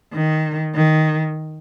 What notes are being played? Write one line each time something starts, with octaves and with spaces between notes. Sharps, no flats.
D#3
D#3